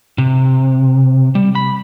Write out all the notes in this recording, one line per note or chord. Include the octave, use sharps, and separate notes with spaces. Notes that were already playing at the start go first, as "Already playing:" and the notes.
C3
G3
B5